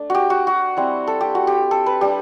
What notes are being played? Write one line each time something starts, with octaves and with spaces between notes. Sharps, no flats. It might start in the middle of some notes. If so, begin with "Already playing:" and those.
Already playing: A3 D4
F#4 G4
F#4
F#4
G3 C4 E4
A4
G4
F#4
G4
A4
B4
G3 D4 G4